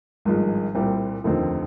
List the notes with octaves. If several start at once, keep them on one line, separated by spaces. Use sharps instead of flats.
G#1 G2 F3 G#3
C2 A#2 G3 C4
F1 D#2 D3 F3 C4